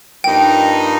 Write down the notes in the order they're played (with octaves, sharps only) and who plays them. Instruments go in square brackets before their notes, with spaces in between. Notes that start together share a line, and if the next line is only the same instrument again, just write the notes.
[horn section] G2 F3 A#3 D#4 [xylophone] G5